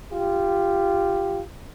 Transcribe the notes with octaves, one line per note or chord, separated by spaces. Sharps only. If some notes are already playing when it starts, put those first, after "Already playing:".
F4 G4